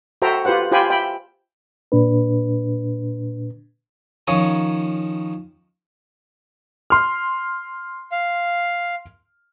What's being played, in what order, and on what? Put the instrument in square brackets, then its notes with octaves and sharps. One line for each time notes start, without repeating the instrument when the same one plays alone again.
[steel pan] F#4 A4 C5 E5 G5 A#5
F4 G4 B4 C5 F#5
F4 G4 C5 G5 G#5 B5
E5 G5 B5
[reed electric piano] A#2 D4 B4
[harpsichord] D#3 F3 C#4 A#4 C#5 D#6
[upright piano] C6 F6
[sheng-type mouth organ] F5